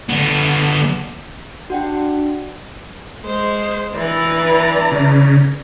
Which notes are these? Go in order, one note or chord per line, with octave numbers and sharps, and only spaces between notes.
D3 B3
D4 F#4 F#5 G5
G#3 C5
E3 B4 D5 A#5
C#3